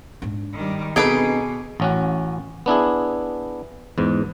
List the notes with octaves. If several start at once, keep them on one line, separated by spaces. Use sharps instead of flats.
G#2 D4
D#3 G3
B2 C4 D4 D#4 G#4 A4 B4 D6
A1 C#4 F#4
B3 D4 E4 G#4
E2 G#2